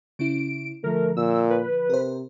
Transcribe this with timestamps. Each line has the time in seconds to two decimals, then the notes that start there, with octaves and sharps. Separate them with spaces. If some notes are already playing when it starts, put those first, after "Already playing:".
0.19 C#3 C#4 E4 D7
0.84 D3 F3 A3 A#4
1.17 A#2 E6
1.50 B4
1.90 C3 A#4 C5